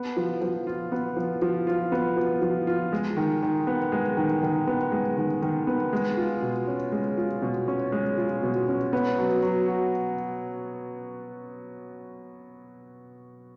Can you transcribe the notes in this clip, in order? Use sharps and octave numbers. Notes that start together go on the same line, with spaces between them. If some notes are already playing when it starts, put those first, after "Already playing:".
Already playing: B3
F3
F3
F4
B3
F3
F3
F4
B3
F3
F3
F4
G#3
D#3
D#3
B3
G#3
D#3
D#3
B3
G#3
D#3
D#3
B3
G#3
F4
B2
C#4
G#3
F4
B2
C#4
G#3
F4
B2
C#4
B3
F#3
F#3
F#4